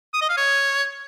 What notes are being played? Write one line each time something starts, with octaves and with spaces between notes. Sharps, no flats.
D#6
D#5
F5
C#5